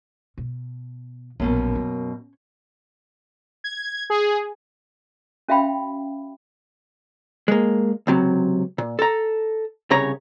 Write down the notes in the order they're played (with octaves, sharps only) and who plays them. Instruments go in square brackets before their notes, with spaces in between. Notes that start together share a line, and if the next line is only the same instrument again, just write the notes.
[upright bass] B2
[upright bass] A#1 F4 [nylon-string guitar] F#2 B2 A#3
[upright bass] C#4
[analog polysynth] G#6
G#4
[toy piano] C#4 F#4 E5 F5 G5 B5
[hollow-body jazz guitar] G#3 A#3
C#2 C3 F#3
A#2
A4 A#5
C2 C#3 C#4 C#5 A#5